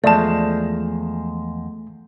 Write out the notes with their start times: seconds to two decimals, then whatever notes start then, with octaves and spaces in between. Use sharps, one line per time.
0.04 E2 F3 G#3 A3 D5 A5